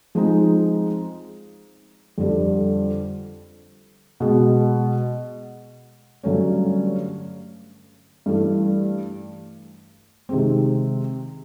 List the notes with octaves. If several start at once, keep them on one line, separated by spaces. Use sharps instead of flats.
F3 G#3 C4 D#4 G#4
F2 D3 G3
B2 G#3 B3
G2 D3 F#3 A3 C#4
G2 E3 A3
C3 D#3 G#3 C4